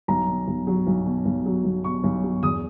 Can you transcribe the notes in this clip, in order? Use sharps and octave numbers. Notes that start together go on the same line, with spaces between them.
B1 A#5
B2
B1
F#3
B1
B2
B1
F#3
B1
B2 C#6
B1
F#3
E2 D#6